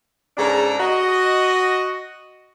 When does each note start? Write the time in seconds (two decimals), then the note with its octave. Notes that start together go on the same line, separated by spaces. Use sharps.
0.37 G#2 C#3 D4 A4 A#4 A#5
0.79 F#4 D#5